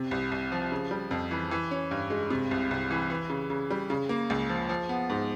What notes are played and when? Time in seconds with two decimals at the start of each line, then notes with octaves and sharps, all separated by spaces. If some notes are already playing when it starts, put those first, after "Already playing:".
Already playing: C3
0.11 C2
0.32 C2
0.52 F3
0.72 C#3
0.91 G3
1.11 F2
1.31 E3
1.51 E3
1.71 C#4
1.91 G2
2.10 G#3
2.30 C3
2.51 C2
2.71 C2
2.91 E3
3.10 E3
3.30 C#3
3.50 C#3
3.70 G3
3.90 C#3
4.09 A#3
4.30 C#2
4.49 F3
4.69 F3
4.89 B3
5.10 G#2